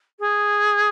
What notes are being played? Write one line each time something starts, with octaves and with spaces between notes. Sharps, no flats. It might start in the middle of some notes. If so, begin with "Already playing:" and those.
G#4